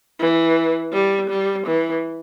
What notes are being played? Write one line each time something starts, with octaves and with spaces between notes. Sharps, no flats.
E3
G3
G3
E3